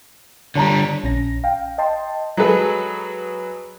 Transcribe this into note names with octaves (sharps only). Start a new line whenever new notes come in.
D3 G3 C#5 A5 A#5
A#1 C#4 A#6
F5 G5
D#5 G5 A5 C6
F#3 G#3 G#4 A4 B4